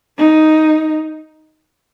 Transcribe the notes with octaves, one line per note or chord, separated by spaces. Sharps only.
D#4